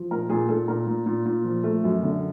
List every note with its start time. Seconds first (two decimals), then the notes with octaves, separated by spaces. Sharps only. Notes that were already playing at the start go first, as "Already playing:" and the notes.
Already playing: F3
0.11 A#2 A#4
0.29 A#2 G#4
0.49 A#2 A4
0.68 A#2 A#4
0.87 A#2
1.06 A#2
1.26 A#2
1.44 F3
1.64 A3
1.84 F#2
2.03 D3